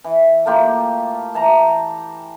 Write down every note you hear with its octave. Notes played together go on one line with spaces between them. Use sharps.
E3
A3 A#3 F4 G4
E3 A5 A#5